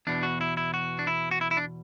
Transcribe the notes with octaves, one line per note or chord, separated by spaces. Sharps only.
E2 B2 D4
F#4
E4
E4
F#4
D4
E4
F#4
E4
E4
D4